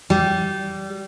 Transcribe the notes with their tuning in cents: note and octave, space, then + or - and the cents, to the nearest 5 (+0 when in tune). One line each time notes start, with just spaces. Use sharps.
G3 -20